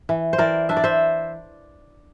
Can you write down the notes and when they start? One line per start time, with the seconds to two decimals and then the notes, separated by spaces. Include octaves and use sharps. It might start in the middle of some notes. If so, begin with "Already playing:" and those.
0.09 E3
0.33 C5
0.38 E3 A#4 D5
0.69 D4 E5
0.77 D5
0.84 C5 E5